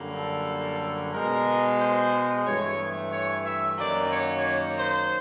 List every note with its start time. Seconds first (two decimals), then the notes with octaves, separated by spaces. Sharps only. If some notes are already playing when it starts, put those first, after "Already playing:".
Already playing: F#2 D3 G3 A#3
0.14 A4
1.13 B2 G#3 A#4
1.80 C5
2.45 G2 E3 A3 C#5
3.12 C#5
3.45 E5
3.78 F#2 D#3 F#3 A#3 D5
4.12 C#5
4.77 C5